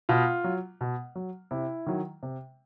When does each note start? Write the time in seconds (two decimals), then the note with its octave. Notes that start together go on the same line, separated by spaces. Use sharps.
0.09 B2 F4
0.44 F#3
0.81 B2
1.15 F#3
1.51 C3 E4
1.87 D#3 F#3
2.23 C3